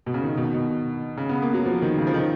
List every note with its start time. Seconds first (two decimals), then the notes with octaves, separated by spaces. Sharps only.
0.06 B2
0.14 C#3
0.22 D#3
0.37 B2
0.54 B2
1.17 C#3
1.29 B3
1.42 A#3
1.54 F#3
1.66 F3
1.82 D#3
1.98 C#3
2.07 F3
2.14 D#3